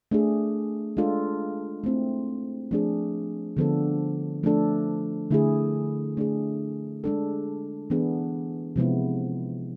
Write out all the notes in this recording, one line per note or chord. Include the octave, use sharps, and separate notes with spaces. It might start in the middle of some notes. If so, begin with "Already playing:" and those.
A3 D4 G#4
G#3 D4 F4 A4
A3 C4 E4
F3 A3 D4 G#4
D3 F3 B3 D4 A4
F3 A3 D4 A4
D3 A3 E4 G#4
A3 D4 G#4
G#3 D4 A4
E3 B3 D4 G#4
C3 F3 G#3 B3 E4